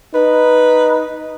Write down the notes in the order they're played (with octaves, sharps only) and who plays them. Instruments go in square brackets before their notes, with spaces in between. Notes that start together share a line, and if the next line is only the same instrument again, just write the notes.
[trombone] D#4 [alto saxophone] B4